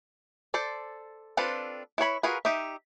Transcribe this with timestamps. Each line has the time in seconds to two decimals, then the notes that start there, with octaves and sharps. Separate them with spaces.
0.54 A4 C5 D5
1.37 C4 D4 F4 A4 B4
1.98 E4 B4 C#5 B5
2.23 F4 F#4 G#4 A#4 B4
2.45 D#4 G4 D#5 E5